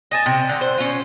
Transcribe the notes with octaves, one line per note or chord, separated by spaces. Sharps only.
D#5 G#5 A5
C3
D3
C5
C#4 F4